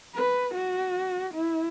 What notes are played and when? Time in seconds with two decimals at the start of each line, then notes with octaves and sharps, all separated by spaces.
0.15 B4
0.55 F#4
1.34 E4